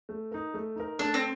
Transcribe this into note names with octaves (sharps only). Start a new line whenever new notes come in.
A3
D#4 A#4
A3
D#4 A#4
A3 D4
C4